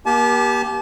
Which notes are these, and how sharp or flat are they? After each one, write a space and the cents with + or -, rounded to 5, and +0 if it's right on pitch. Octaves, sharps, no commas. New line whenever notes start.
A#3 +35 G4 +0 A5 -40